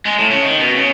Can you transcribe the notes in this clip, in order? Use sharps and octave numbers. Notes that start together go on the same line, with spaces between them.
G#3
A2
C#3
D#3
B2
C#3